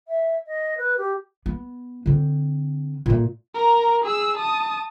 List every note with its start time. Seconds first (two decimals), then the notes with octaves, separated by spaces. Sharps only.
0.08 E5
0.46 D#5
0.77 B4
0.97 G4
1.46 B3
2.06 D3 C4
3.06 A#2 A3
3.55 A#4 A#5
4.04 G#4 E6
4.37 A5 D#6